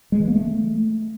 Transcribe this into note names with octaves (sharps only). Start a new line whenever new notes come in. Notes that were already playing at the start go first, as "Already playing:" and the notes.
G#3
E3
A#3
A3